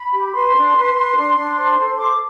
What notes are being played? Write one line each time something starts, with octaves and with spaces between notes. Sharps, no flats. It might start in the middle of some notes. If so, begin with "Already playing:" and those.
Already playing: B5
G4
B4 C6
D4
B4
B4
D4
D4
C5
A4
C5 D6